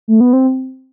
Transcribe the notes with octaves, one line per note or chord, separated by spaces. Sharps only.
A3
B3
C4